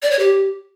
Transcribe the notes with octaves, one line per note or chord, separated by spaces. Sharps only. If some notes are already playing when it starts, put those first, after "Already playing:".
D5
C#5
G4